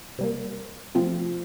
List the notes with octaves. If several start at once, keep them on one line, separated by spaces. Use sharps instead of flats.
C3 G3 A#3
C3 F3 A3 C4 F4